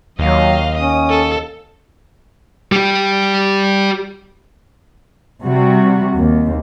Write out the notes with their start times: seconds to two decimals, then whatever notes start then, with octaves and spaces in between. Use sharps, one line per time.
0.19 D#2 F#3 D#5 F5
0.78 C#4 D#6
1.10 A4
2.72 G3 G4
5.42 C3 G3 F#4
6.16 D#2